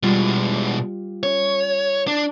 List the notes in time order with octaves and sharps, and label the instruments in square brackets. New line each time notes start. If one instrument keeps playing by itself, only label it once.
[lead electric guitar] B2 G#3 [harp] G3 F4
[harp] C#4 [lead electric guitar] C#5
[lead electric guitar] D4